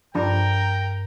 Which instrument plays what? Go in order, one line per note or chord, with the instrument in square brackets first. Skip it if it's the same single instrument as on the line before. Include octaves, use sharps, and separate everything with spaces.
[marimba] G2 [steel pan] F3 D4 [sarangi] A#4 [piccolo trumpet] G5